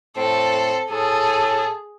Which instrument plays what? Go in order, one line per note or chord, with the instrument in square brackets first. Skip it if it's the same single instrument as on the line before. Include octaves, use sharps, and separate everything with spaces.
[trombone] A2 [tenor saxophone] C4 [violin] A4
[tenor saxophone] A2 [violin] G#4 [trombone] A4 [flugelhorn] A5